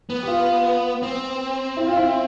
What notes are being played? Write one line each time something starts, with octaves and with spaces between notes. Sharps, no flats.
B3
G4
F4
C4
E4
F4
E4